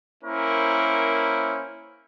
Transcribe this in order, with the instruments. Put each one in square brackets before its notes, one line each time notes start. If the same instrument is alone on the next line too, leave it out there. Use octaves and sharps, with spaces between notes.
[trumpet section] A#3 C#4 E4 A#4 C5